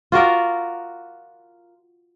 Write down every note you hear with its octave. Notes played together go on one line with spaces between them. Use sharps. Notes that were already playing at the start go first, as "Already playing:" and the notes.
F4 F#4 A#4 D5